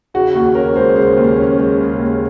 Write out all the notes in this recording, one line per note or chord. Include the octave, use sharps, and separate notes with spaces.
C#3 F#4
D#2 F#4
C#4 A#4
G#3 C5
C#3 C5
D#2
C#4
G#3
C#3
D#2